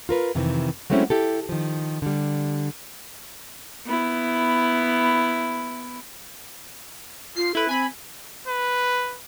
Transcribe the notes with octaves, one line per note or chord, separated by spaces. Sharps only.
F4 A#4 B4
F2 C3 D#3 E3
F#3 G#3 A3 C4 C#4 E4
E4 G4 A4
D#3 F3
D3 G3
B3 E4
F4 C7
E4 A4 B4
C4 G#5 B5
B4